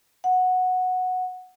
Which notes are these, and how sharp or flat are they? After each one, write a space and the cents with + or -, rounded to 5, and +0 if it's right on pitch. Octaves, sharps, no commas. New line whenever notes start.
F#5 -10